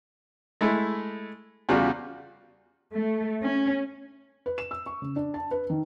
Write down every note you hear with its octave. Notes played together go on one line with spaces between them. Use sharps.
G#3 A3 E4
E2 C#3 G3 F4 F#4
A3
C#4
B4
E7
E6
C#6
C#3
D4
A5
B4
D#3